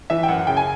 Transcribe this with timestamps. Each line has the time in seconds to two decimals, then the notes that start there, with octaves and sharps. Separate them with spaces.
0.10 E3 E5
0.23 G5
0.28 F#2 F#5
0.39 F#5
0.47 C#3 G5
0.57 G#5